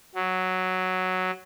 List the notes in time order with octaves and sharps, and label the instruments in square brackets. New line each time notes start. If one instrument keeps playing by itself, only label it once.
[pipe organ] F#3